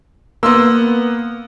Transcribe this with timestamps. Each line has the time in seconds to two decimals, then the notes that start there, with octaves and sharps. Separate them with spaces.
0.43 A#3 B3 C6 E6